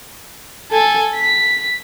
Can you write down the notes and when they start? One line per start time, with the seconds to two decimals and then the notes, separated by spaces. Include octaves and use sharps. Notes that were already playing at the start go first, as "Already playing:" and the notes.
0.71 A4 G#5
1.15 B6